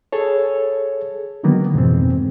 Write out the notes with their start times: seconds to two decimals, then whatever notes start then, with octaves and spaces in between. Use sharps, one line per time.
0.12 G#4 A4 C#5
1.43 D3 D#3 F#3 A#3 B3
1.74 F2 G#2 B2 E3 C4